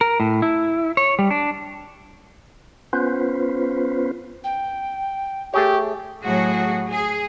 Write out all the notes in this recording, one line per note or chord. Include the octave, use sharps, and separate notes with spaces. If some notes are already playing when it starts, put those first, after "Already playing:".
A#4
A2
E4
C#5
G3
D4
B3 C#4 F4 B4 C5
G5
A3 G4 G#4 C#5
A2 F#3 F#4 G#4
G#4